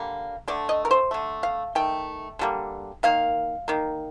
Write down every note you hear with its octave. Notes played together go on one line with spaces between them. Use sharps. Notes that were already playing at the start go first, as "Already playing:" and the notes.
Already playing: D3 G3 A#3
D3 A3 D5
D#5
A#4
C5
D3 A3
F5
D#3 A3 G5
D3 G3 A#3
D#3 A#3 F5
D#3 A#3